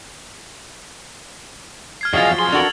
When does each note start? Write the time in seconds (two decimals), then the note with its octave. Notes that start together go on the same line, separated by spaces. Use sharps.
2.01 F6 G#6 C7
2.13 E2 F3 F#3 G#4 D#5 F5 A6 C7
2.39 F2 G#4 C6
2.52 D4 F#4 A4 A#4 F7 F#7